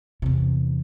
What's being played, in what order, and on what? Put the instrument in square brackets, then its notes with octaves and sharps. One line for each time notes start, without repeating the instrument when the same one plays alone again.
[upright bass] E2 C3